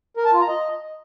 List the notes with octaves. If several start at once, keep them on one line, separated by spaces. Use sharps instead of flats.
A#4
A5
F4
A#5
D#5